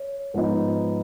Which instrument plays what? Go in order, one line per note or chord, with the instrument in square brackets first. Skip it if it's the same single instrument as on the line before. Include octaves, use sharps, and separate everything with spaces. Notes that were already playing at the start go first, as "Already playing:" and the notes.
Already playing: [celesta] C#5
[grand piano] G#2 F3 B3 D#4